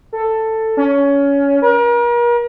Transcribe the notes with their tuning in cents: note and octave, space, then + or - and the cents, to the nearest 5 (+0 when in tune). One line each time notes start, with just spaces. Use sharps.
A4 +10
C#4 +20
A#4 +40